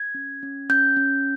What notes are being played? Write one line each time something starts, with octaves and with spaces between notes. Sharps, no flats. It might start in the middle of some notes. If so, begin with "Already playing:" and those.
Already playing: G#6
C#4
C#4
C#4 G6
C#4